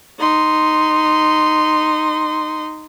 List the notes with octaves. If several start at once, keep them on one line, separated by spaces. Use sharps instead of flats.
D#4 C6